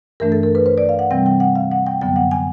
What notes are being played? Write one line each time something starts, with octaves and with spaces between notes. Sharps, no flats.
G2 E3 A3 D4 A#4
A4
A#4
B4
C5
D5
F5
F#5
C3 E3 G3 C4 G5
G5
F#5
F5
F#5
G5
F#2 D3 F#3 B3 G5
F#5
G#5